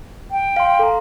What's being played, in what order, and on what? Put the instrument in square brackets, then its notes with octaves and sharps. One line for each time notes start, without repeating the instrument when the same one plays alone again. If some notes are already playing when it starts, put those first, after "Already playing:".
[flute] G5
[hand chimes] F5 C6
A4 A#5